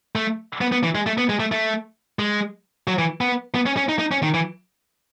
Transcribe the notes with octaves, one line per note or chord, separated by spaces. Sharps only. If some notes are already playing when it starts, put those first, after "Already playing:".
A3
B3
B3
E3
G#3
A3
B3
G#3
A3
A3
G#3
F#3
E3
B3
B3
C#4
C#4
D#4
D#4
C#4
D#3
E3